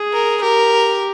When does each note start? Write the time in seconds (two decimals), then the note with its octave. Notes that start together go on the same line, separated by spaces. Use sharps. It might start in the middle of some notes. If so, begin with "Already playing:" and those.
Already playing: G#4
0.13 A#4
0.42 G4 A#4